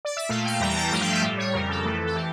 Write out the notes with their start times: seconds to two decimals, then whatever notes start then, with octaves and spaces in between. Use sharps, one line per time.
0.05 D5
0.17 E5
0.29 A#2 A3 F5
0.46 G5
0.60 E2 E3 G3 A#5
0.69 G5
0.76 A5
0.91 G2 F3 A3 G5
1.01 F5
1.12 E5
1.22 A2 G3
1.38 C#5
1.53 F2 C#3 G3 A#4
1.70 A4
1.84 F2 E3 A3
2.07 A4
2.15 E3 G4